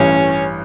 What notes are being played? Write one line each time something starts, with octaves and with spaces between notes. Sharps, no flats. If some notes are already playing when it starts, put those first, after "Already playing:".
Already playing: A1 G2 E3 C#4